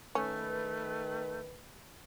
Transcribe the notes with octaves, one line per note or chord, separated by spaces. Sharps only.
D#3 A3 C#4 B4